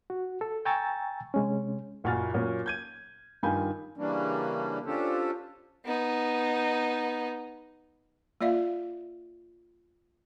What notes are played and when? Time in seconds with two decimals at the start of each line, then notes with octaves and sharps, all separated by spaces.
0.10 F#4
0.41 A4
0.65 G5 G#5 A#5 C#6 E6 A6
1.34 C3 G#3 C#4
2.04 F#1 A#2 F#4 G#5 F6 A6
2.34 A#2 F#3 C#4
2.66 G6 G#6 D#7
3.43 G2 D#3 F4 G#5 B5 G6
3.97 C#3 E3 G3 A#3 C#4 D4
4.86 C#4 D4 F4 G4 A4 C5
5.85 B3 D#4
8.41 A#3 F4 D5 E5 F5